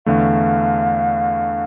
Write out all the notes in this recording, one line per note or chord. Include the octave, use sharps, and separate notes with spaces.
E2 D3 A3 F5